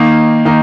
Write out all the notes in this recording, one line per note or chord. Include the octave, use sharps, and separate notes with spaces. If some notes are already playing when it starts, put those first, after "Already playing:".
Already playing: D#3 A#3 D#4
D#3 A#3 D#4